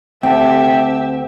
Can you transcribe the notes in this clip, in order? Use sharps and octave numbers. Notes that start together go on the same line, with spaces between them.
D2 C4 G4 E5 G5 A5